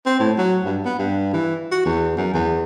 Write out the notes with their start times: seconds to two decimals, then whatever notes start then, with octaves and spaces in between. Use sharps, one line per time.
0.06 C4
0.19 A2
0.38 F#3
0.65 G2
0.85 B3
0.99 G2
1.34 E3
1.72 F#4
1.85 E2
2.17 F#2
2.34 E2